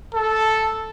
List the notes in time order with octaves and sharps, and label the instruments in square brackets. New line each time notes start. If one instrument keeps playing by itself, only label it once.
[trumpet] A4